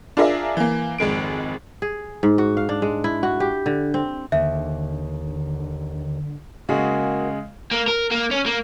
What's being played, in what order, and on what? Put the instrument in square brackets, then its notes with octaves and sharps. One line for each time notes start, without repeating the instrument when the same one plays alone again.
[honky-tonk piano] D4 F4 G#4 A#4 D5 E5
E3 A#3
G#1 F2 G#3 D7
[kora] G#4
G#2
F#4
F5
D4
G#3
E4
F#4
G4
D3
C4
[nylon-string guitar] D#2 [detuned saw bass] D3 [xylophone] E5
[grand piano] C#3 G#3 G#4 [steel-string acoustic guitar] A#3 F#4
[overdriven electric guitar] A#3
A#4
A#3
C#4
A#3